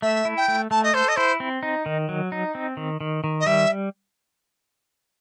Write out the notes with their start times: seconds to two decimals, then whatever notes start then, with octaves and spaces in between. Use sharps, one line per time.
0.02 A3 E5
0.25 E4
0.37 G5
0.48 A3
0.71 A3 A5
0.83 D#5
0.94 A4 C5
1.08 D#5
1.16 E4 C5
1.40 C4
1.63 D#4
1.86 D#3
2.09 F#3
2.32 D#4
2.55 C4
2.77 D#3
3.01 D#3
3.24 D#3
3.40 D#5
3.46 G3 E5